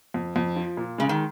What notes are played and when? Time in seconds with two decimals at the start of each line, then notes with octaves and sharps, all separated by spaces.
0.14 F2
0.36 F2
0.56 F3
0.77 A#2
0.98 C#3 G#3
1.09 D#3